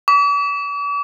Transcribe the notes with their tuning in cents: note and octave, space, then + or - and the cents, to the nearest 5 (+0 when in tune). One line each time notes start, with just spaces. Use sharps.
D6 -45